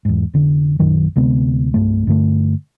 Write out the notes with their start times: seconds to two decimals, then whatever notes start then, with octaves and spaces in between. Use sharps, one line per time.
0.05 E2 G#2
0.33 F1 D3
0.79 A#1 F#2 D#3 F#3
1.16 D2 C3 G#3 B3
1.74 C2 G2 A3
2.07 G2 D3 A3